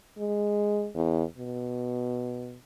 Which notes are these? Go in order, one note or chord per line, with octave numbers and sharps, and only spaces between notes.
G#3
E2
B2